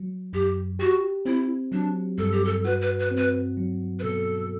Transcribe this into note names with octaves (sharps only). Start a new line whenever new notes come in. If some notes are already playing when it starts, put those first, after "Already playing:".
Already playing: F#3
F#2 G4
F#4 G4
C4 E4
F#3 D4
G2 A4
G4
A4
F#4 B4
B4
B4
C4
B4
F#3
B4
B2 A4